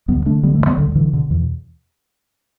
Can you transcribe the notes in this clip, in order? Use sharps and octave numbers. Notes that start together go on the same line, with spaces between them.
D2 G3 B3
D3 A3 D4
D3 G3 B3
E3 A3
D2
G3 B3
D2 D3 G3
D3 E3
B2 D3
E2 E3